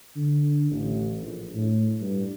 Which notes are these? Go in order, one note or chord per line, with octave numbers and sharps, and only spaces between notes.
D3
A1
A#1
A2
G2